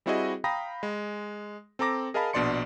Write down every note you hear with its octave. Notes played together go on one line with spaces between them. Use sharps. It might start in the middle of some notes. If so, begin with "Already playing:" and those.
G3 C4 E4 F#4 G#4 D#5
F5 G5 A#5 B5 D#6 A#6
G#3
C4 A4 A#5 D6 A#6
G#4 A#4 D#5 F5 A5 B5
A#1 B2 D4 D5 C6 C#7